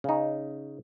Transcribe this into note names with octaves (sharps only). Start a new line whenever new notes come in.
C#3 D#4